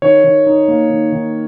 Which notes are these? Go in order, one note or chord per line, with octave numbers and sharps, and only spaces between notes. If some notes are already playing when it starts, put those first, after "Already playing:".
D#3 C#5
D#3
D#4
A#3
D#3
D#3